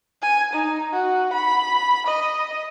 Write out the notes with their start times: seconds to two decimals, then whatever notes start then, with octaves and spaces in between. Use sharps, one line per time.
0.22 G#5
0.53 D#4
0.93 F#4
1.33 B5
2.06 D#5